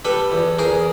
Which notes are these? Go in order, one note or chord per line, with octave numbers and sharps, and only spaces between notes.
G3 A4 B4
E2
E2 G#4 A#4